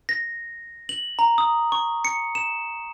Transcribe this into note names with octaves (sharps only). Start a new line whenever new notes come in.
A#6
F#7
A#5
D#6
C#6
C#7
E7